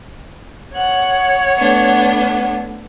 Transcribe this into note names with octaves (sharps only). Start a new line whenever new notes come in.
C#5 F#5 F#6
A3 B3 D4